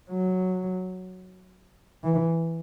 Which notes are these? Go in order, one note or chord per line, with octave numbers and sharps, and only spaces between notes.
F#3
E3